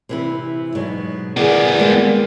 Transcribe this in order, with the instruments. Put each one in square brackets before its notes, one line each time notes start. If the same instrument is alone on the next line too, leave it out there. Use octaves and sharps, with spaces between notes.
[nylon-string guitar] C3 E3 E4
G#2 B2 F#3
[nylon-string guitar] D#3 G#4 A#4 [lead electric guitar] B3 D5
[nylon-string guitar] G3 G#3 A#3